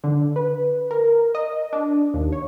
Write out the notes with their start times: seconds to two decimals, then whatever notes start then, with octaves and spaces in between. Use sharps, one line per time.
0.04 D3
0.36 B4
0.91 A#4
1.35 D#5
1.73 D4
2.14 D#2
2.32 C#5